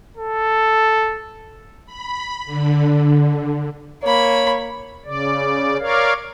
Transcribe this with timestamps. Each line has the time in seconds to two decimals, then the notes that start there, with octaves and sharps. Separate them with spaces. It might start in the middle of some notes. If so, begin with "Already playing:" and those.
0.17 A4
1.86 B5
2.46 D3
4.03 A#3 C#5 B5
5.05 C#3 D5
5.79 A#4 C#5 D5 F5